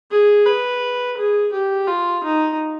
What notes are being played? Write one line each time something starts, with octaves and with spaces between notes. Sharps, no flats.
G#4
B4
G#4
G4
F4
D#4